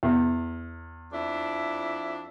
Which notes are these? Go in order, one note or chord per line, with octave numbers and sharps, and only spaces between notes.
E2
F2 D4 E4